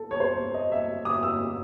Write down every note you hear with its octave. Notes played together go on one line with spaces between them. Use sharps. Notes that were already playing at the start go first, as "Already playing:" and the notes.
Already playing: A4
C#5
C5
D#5
E5
D#6
E6